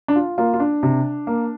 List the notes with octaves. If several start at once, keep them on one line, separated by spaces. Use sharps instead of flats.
D4
F4
A#3 F4
F4
D4
C3
A#3